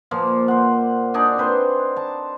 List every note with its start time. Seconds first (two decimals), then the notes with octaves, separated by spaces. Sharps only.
0.11 A#2 F3 A#3
0.48 C5 F#5
1.14 D4 D#4 G#4 D5
1.38 C4 B4 C5
1.96 A5